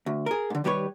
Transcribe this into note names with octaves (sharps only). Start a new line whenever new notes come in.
D2
G#4 A#4
G#2 D3
D#3 G3 G4 B4 C#5